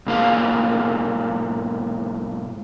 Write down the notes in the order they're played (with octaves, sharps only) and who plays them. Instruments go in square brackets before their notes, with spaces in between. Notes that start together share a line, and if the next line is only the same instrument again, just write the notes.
[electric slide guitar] G#2 B2 A#3 F4 G#4 F5